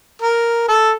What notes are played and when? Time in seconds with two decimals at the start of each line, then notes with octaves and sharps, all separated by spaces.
0.22 A#4
0.68 A4